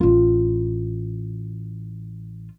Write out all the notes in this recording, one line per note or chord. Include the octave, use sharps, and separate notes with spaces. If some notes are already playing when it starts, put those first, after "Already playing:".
A1 F4